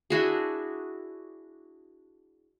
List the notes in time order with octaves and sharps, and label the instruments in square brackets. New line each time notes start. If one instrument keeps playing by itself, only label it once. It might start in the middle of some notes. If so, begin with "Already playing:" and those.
[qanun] D4 E4 F#4 G#4